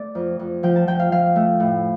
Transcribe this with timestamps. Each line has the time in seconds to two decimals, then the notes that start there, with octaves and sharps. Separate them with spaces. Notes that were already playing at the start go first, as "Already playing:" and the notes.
Already playing: A3 D5
0.15 F2
0.39 F2
0.63 F3 G5
0.76 A5
0.87 F3 G5
1.00 F5
1.12 F3 F5
1.36 A3
1.60 A2